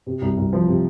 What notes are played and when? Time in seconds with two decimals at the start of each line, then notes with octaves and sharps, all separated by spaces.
0.06 C3
0.22 C2
0.37 C2
0.53 F3
0.68 C3